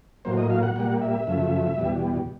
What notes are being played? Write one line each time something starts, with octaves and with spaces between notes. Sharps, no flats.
A2 F#3 A#3 C5
D#5
F5
F#5
A#2 G3 A#3 F#5
E5
F#2 C#3 F3 A3
E2 B2 G3